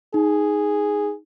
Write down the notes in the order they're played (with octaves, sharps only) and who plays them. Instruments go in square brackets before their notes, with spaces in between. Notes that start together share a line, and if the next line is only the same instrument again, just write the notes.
[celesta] D#4 [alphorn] G#4